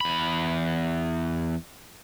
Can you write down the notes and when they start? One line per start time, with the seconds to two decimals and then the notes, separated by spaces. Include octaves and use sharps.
0.01 E2 B5